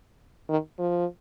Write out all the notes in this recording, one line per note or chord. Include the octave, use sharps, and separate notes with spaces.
D#3
F3